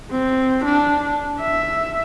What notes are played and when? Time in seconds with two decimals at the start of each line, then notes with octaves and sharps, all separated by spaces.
0.11 C4
0.66 D4
1.41 E5